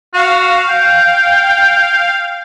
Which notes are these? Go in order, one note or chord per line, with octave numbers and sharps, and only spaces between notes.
F#4 F5
G5